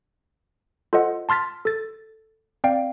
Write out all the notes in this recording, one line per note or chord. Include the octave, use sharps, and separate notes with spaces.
F4 A4 C5 D#5 F#5
A5 C6 F6 A6 B6
A4 A6
C4 D5 F5 G5